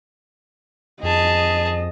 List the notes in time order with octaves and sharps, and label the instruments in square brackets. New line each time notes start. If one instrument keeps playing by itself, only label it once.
[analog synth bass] F2 [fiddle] G#4 A5 [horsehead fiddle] D#5